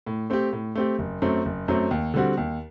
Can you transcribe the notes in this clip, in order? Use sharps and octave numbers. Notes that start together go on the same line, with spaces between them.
A2
A3 C4 G4
A2
A3 C4 G4
F#1
F#2 F#3 A3 C4
F#1
F#2 F#3 A3 C4
D#2
D3 G3 C4 F#4
D#2